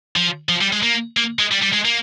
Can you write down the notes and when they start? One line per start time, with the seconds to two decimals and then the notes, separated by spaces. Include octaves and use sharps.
0.16 F3
0.49 F3
0.61 G3
0.73 G#3
0.83 A#3
1.17 A#3
1.39 G#3
1.52 G3
1.62 G3
1.73 G#3
1.85 A#3